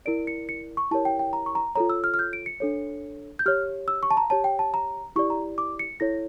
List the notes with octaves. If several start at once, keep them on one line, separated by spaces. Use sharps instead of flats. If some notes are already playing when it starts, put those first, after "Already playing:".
E4 A#4 D5 D7
C#7
C#7
C#6
E4 G4 A#4 C#5 A5
G5
G5
A#5
C#6
A#5
F4 A4 C#5 A#5
E6
F6
F6
G6
D7
C#7
D4 A4 C#5
G6
G4 C#5 F6
E6
C#6
A5
A#5
G4 C#5 A5
G5
A5
A#5
E4 G4 D5 C#6
A#5
D6
C#7
E4 A4 C#5 A#6